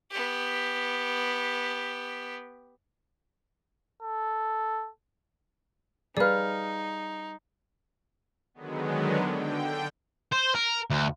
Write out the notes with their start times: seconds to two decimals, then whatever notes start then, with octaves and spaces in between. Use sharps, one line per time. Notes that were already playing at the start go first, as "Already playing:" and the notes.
0.11 B3 G4
4.03 A4
6.17 G3 D#4 G#4 B4 D5 F5 F6
8.54 D3 D#3 F#3 G#3 B3
9.28 D3 G5
10.33 C5
10.55 A#4
10.90 D2